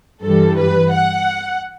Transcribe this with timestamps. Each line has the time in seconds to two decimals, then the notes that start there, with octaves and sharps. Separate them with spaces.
0.23 G2 E3 G3 A4
0.57 B4
0.93 F#5